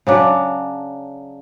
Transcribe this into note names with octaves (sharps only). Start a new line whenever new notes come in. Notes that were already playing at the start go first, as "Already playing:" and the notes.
C#3 F#3 D4